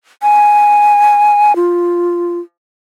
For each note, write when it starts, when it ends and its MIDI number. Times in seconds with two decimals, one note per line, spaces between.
0.22 1.56 80
1.56 2.39 65